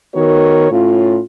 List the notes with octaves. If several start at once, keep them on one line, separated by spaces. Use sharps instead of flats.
D#3 B3 F#4 A#4 C#5
A2 C#4 F4